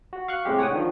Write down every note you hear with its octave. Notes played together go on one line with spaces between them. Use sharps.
F#4
F5 C#6 F#6
A2 C3 G#3 G4
C#5 F#5 G5 D#6
D3 D#3 F3